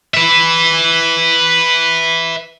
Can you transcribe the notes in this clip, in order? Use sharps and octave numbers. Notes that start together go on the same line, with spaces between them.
B4 E5